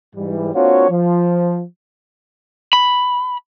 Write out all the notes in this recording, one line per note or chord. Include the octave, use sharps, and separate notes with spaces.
G#2 E3 G3
A#3 C4 D4 F4 F#4 C#5
F3
B5